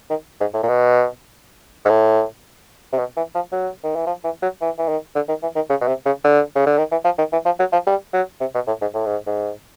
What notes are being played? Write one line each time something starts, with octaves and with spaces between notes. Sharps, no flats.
D#3
G#2
A2
A#2
B2
G#2
A2
C3
B2
E3
F3
F#3
D#3
E3
F3
E3
F#3
E3
E3
D#3
D3
D#3
E3
D#3
C#3
B2
C3
C#3
D3
C#3
D3
D#3
E3
F3
D#3
E3
F3
F#3
F3
G3
F#3
C3
B2
A2
G#2
A2
G#2
G#2